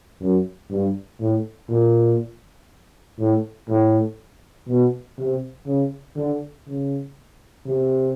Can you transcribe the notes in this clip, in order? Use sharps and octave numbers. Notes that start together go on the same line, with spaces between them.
F#2
G2
A2
A#2
A2
A2
B2
C3
C#3
D3
C#3
C3